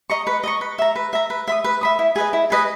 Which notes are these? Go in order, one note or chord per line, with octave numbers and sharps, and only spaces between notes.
D#5 A#5 C#6
B4
D#5 A#5 C#6
B4
E5 A#5
B4
E5 A#5
B4
E5 B5 D#6
B4
E5 B5 D#6
E4
G#4 B4 D#5
E4
G#4 B4 D#5